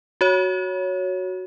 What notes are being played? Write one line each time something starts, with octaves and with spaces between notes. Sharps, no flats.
F#4 C#5